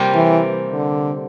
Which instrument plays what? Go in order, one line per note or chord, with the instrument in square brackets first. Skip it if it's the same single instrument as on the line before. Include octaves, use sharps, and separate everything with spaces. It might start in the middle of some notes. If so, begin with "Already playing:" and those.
Already playing: [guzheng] C3 G3 A#3 F4 A#4
[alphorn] E3
D3